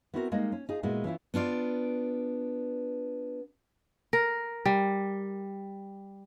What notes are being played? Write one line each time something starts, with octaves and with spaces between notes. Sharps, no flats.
B3 C4 E4 F#4 G4 A#4
G3 G#3 A#3 D#4
C#4
D#4 F4 G#4
A#2 G#3 B3 E4 F#4
E3 C#4 E4 F4
B3 D4 F4 D5
A#4
G3